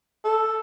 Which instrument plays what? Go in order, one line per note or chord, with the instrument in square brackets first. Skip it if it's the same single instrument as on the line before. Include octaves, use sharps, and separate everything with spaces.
[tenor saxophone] A4